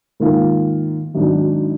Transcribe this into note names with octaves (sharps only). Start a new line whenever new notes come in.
G#2 D#3 A#3 F4
G#1 G#2 F#3 D4